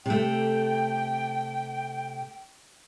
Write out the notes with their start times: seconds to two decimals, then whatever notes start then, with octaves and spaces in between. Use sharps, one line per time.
0.06 C3 A3 G5